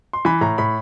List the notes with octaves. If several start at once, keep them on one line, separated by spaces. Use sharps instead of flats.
C6
E3 B5
A2 A#5
A2 B5